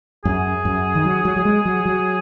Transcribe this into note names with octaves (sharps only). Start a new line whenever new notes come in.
F#2 G#4
F#2
D#3
F#3
F#3
F#3
G#3
F#3
F#3